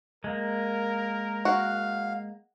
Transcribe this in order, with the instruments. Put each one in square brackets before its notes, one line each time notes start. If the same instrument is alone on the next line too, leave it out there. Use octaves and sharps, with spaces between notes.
[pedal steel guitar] G#3 A#3 [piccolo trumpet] A#4
[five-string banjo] F#4 [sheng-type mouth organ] F5